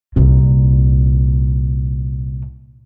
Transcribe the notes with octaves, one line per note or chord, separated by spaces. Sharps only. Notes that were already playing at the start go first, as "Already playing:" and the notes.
C2 A#2